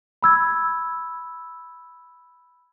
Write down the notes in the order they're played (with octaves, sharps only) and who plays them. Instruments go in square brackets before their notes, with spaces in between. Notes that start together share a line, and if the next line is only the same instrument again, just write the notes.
[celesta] B5 E6 G#6